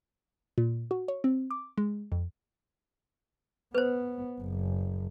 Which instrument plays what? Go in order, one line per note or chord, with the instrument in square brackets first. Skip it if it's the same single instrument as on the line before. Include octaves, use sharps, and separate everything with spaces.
[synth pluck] A#2
F#4
C#5
C4
D6
G#3
F2
[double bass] B3 [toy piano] B4 C5
[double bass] F#1